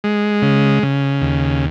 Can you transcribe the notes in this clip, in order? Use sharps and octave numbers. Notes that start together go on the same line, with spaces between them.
G#3
C#3
C#3
D#2